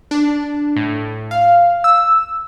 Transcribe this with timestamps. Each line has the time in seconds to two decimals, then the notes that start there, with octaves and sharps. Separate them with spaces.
0.11 D4
0.76 A2
1.31 F5
1.84 E6